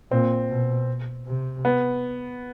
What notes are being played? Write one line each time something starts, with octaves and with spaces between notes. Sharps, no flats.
A#2 C4
B2
C3
B3